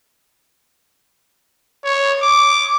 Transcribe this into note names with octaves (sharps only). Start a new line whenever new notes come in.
C#5
D6